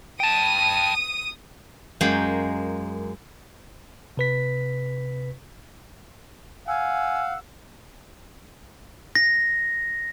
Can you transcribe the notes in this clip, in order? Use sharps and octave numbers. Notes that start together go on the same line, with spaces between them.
G5 A5 D#6 D#7
F#2 G#3 A#3 G5
C3 B4 B6
F5 F#5 G#5 E6
A#6